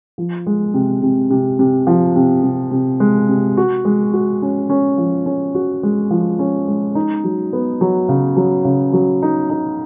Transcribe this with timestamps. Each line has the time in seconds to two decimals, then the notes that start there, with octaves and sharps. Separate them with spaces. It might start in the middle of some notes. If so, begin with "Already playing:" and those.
0.18 F3
0.47 G#3
0.74 C3
1.02 C3
1.31 C3
1.59 C3
1.87 F3
2.16 C3
2.44 C3
2.71 C3
3.00 G#3
3.29 C3
3.57 F#4
3.85 G#3
4.13 F#4
4.42 C#4
4.70 C#4
4.98 F3
5.26 C#4
5.55 F#4
5.83 G#3
6.11 F3
6.39 C#4
6.68 G#3
6.95 D#4
7.24 F#3
7.53 B3
7.81 F#3
8.09 C#3
8.37 F#3
8.65 C#3
8.93 F#3
9.23 D#4
9.50 D#4